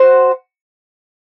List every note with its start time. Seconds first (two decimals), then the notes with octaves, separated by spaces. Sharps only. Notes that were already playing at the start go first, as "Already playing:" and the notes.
Already playing: C4 F#4 C5